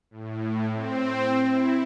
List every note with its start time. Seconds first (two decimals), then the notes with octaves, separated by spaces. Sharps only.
0.10 A2
0.74 C4
1.49 E4